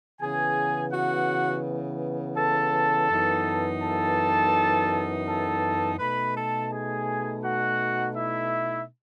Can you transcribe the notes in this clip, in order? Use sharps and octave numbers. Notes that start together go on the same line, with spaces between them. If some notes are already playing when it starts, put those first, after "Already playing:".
C#3 E3 B3 G#4 G#5
F#4 F#5
A4 A5
F#2 E3 B3 D#4
A4 A5
A4 A5
B2 A3 D#4 B4 B5
A4 A5
G#4 G#5
F#4 F#5
E4 E5